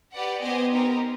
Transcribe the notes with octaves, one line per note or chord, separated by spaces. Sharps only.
G4 B4 D5 F#5
B3 G4 C5 D#5 G#5
C4 D#4 G4 A#4